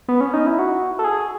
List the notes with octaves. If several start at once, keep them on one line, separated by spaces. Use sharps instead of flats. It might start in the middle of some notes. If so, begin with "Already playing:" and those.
B3
C#4
D#4
E4
F#4
A4
G#4